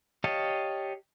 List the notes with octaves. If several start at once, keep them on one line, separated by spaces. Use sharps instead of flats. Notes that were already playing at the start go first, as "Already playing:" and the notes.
G4 C#5 D#5 F5 A5